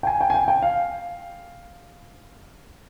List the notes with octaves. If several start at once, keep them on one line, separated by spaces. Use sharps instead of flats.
G5
G#5
G5
G#5
G5
G5
F5